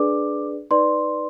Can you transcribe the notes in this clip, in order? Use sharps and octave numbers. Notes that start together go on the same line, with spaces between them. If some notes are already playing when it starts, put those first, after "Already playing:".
Already playing: D4 G#4 B4 D5 D6
D#4 B4 D5 C6